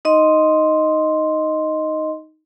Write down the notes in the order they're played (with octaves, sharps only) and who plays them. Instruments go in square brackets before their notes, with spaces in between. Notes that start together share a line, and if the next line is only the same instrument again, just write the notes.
[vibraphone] D#4 D#5 C6